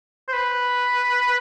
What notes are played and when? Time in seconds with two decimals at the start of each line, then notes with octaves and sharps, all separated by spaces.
0.28 C5
0.33 B4